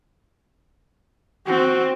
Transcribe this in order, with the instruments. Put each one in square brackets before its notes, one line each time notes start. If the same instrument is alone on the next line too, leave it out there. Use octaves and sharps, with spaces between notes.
[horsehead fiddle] C4 [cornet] F#4